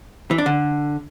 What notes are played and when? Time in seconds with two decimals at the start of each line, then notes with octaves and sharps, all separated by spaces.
0.31 E3
0.38 D4
0.46 D3